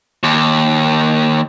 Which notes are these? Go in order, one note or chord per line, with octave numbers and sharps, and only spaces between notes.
D#2